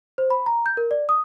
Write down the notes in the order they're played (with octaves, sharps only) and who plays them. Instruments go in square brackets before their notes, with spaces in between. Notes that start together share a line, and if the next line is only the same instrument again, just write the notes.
[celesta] C5
B5
A#5
G6
A#4
D5
D#6